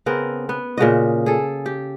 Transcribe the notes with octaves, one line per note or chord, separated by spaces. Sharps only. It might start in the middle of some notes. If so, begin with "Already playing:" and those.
C#3 B3 C4 A#4
B3
A#2 C#3 F#4 D#5
G#4 A4
G4